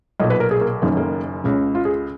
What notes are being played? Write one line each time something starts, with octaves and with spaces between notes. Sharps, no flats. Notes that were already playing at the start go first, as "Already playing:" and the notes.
B1 A#2 D#5
B4
A#4
G#4
A#3
F#1 F#2 D#3 A#3
A#3
C#2 C#3
F4
G#4